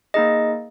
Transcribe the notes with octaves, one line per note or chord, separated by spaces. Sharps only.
A#3 D#4 G#4 D#5